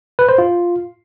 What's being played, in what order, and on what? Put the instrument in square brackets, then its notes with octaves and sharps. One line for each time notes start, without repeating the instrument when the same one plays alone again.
[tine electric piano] B4
C5
F4